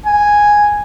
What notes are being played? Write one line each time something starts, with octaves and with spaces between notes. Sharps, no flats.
G#5